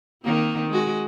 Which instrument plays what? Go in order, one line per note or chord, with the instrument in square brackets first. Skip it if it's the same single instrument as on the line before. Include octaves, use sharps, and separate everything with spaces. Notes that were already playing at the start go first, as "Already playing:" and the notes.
[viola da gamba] D#3 A#3 C4
G#3 F#4